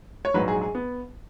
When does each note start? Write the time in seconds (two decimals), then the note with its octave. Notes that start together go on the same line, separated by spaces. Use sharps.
0.25 C#5
0.34 A#1 G#2 F#3 B4
0.48 G#4
0.61 G#4
0.75 B3